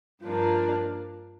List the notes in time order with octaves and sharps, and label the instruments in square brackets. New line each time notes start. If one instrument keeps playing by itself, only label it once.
[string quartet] G2 F3 A#3 D4